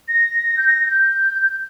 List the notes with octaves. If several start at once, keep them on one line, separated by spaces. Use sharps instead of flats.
A#6
A#6
G6
A#6
G6